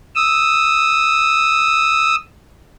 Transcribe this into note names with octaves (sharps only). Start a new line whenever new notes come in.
D#6 E6